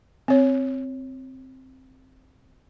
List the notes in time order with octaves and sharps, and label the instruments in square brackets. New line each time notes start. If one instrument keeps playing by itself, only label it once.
[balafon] C4 C#5